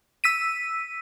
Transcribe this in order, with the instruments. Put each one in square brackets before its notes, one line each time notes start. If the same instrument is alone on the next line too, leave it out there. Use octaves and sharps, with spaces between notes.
[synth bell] E6 B6 D#7